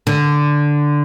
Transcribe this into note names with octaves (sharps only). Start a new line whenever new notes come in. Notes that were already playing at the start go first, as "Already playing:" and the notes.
D3